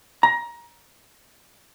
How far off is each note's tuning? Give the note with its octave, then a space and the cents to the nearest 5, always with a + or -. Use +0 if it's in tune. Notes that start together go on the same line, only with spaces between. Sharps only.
A#5 +25